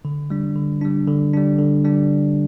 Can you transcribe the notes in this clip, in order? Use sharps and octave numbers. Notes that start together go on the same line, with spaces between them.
D3
G3 D4
D3
G3 D4
D3
G3 D4
D3
G3 D4